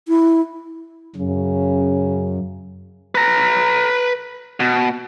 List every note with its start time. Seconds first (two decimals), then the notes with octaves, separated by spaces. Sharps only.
0.08 E4
1.16 F#2 C#3
3.15 B4 A#5
4.60 B2